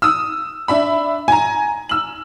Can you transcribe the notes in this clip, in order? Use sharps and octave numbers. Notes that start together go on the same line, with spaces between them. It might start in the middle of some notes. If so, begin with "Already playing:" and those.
D#6 E6
D4 E5 B5
G#5 A#5
E6 F#7